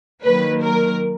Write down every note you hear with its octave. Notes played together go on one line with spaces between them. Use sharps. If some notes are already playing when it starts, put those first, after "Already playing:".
D#3 F#3 A#3 B4
A#4